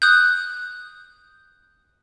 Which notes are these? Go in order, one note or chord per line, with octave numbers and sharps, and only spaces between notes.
D#6 F#6 G6